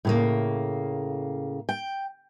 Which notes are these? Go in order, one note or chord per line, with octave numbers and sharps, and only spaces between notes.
A2 C#3 A#3
G5